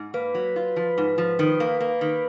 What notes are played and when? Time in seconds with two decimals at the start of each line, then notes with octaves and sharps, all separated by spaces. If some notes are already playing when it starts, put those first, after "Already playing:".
Already playing: G#2
0.14 A#3 B4
0.35 F#3
0.56 F4
0.76 F3
0.98 G#2
1.18 F3
1.39 D#3
1.60 A#3
1.81 A#3
2.01 D#3